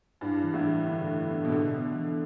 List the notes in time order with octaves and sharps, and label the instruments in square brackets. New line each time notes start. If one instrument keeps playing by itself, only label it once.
[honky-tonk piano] G2 [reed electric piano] E4
[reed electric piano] E3
[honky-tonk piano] A2
[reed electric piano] E3
[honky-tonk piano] D3 [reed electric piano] A4
[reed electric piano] A4
B3
[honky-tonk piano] B2
[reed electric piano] A2 [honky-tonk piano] D3
[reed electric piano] B3
E3